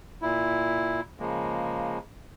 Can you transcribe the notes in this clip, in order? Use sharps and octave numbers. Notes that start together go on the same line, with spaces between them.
A#2 E4
C#3 F3 G#3 A#3